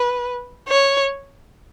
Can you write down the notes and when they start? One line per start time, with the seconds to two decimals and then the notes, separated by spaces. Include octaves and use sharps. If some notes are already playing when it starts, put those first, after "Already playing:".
Already playing: B4
0.68 C#5